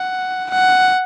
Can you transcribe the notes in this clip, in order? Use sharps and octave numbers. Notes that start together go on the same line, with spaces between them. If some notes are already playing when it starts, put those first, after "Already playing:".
Already playing: F#5
F#5